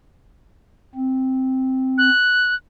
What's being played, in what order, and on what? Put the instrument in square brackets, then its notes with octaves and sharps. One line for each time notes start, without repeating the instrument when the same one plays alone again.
[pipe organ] C4
[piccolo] F#6